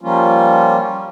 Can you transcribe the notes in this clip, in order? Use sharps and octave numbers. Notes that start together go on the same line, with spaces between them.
F3 G3 A#3 C#4 F4